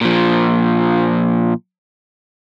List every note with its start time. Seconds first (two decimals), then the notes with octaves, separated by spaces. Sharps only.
0.01 A#2 F3